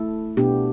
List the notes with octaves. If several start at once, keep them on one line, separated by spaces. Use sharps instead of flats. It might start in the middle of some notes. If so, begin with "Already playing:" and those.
Already playing: A3 E4 A4
B2 B3 D4 G4